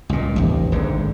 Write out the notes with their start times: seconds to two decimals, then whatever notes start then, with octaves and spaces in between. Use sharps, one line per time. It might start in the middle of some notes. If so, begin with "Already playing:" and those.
0.09 C#2 A#2
0.36 A1 D#2
0.72 G#1 G#2 D3